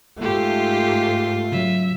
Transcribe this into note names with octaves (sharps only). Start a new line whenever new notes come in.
G#2 A3 F4 G4 C6
C#3 F#3 E5